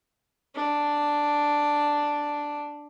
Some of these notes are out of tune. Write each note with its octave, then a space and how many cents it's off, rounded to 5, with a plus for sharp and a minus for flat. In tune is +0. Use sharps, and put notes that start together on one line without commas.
D4 +0